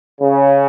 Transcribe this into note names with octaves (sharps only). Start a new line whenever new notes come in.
C#3